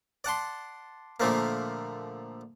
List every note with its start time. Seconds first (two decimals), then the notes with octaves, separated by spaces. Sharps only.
0.24 D5 F#5 A5 C6
1.20 A#2 D3 F3 A3 A#3